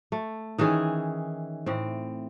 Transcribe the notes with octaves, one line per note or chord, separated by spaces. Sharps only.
A3
D#3 E3 C#4 G#4
A2 C4